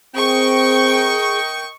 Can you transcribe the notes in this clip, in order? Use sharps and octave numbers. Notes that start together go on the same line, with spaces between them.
C4 G#4 A#4 D#5 G5 C#6